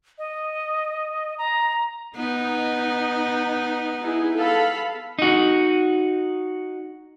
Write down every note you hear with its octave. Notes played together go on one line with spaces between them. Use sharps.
D#5
A#5
B3 D#4
D#4 E4 G#4
A4 F5 B5
D#4 F#4